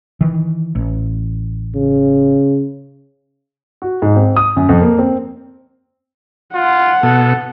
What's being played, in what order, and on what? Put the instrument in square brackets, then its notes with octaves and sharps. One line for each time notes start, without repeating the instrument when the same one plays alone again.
[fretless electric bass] D#3 E3
A1
[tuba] C#3
[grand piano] F#4
G#2
C4
D#6
F#2
F2
A#3
C4
[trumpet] F4 [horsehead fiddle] F#5
[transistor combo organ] B2 [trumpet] A4